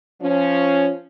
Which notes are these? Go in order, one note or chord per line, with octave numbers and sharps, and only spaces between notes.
F3 C#4